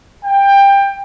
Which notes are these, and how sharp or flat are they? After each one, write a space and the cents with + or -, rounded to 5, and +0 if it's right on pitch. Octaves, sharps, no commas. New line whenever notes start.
G5 +20